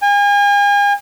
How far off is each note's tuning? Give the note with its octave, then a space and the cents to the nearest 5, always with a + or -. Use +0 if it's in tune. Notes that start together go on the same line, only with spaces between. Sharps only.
G#5 -40